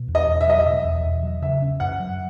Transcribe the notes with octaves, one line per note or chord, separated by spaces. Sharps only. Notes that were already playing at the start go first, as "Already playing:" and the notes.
Already playing: B2
E2
D#5
E2
E5
F#3 D#5
E5
B2
E2
E2
F#3
C#3 E5
C#4
F#2 F#5
F#3